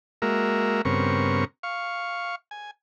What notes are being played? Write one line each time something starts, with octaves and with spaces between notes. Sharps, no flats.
G#3 A#3 F#4 A#4 E5
G2 C#3 B3 C4 A#4 C#6
F5 C#6
G#5